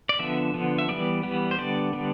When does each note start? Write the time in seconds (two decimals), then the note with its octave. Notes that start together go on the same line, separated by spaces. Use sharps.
0.09 D5
0.19 D3 F3 B3 E5
0.54 D3 F3 B3
0.78 E5
0.88 E3 G3 B3 D5
1.23 E3 G3 B3
1.51 C5
1.58 D3 G3 B3 D5
1.93 D3 G3 B3